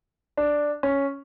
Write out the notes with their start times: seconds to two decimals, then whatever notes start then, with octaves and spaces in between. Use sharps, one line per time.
0.37 D4
0.83 C#4